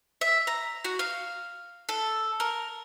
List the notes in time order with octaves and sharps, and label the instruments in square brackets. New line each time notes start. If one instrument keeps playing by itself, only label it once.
[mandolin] E5
A#5
F#4
F5
A4
A#4